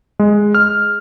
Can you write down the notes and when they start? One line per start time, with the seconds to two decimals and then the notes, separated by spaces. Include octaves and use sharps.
0.19 G#3
0.55 F6